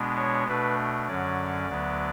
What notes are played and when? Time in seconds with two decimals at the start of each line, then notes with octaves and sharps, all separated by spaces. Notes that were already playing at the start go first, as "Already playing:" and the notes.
Already playing: B2 G#3 B3 D4
0.17 C#5
0.48 B2 A3 D4 B4
1.08 F#2 D3 F#3 C#4 D5
1.68 D2 D3 F#3 B3